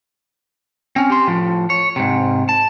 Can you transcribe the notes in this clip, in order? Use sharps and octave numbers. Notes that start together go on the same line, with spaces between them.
C4 C#4
G4 C6
A2 F3
C#5
G#2 C3
A5